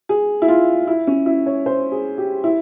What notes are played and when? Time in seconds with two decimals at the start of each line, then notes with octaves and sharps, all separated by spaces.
0.09 G#4
0.42 E4
0.48 F4
0.88 E4
1.07 C#4
1.26 E4
1.46 C#5
1.66 C5
1.92 G#4
2.18 G4
2.44 E4